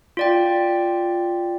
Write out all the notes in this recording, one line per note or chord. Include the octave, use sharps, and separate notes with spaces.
F4 D5 G5